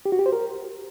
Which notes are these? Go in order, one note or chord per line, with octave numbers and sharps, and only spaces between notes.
G4
F#4
G4
C5
A#4